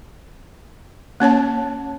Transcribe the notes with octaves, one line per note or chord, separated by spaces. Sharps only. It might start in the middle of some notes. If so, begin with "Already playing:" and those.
A#3 C#4 C#5 A5